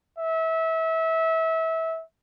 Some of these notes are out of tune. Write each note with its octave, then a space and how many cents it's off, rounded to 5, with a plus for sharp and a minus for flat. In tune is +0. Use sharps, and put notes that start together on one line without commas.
E5 -25